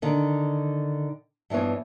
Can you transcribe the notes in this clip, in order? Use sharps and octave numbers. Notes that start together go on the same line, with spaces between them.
D3 D#3
G2 E3 F3 B3 C#5